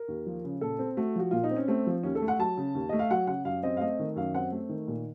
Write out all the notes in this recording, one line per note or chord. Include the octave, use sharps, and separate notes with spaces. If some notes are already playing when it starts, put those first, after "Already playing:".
Already playing: A#4
D#2
F3
C#3
A#2 A4
C4
A3 F#4
F3 F#4
A#2 F4
D#4
C4
C#4
A3 C4
F3
D#2 C#4
A4
A3
F#5
F#3 A5
C#3
D#2
A3 D#5
F5
F#3 F#5
C#3 F#5
F#2 F5
C4 D#5
F5
A3 D#5
D#3
F#2 F5
C4 F#5
A3
D#3
A#2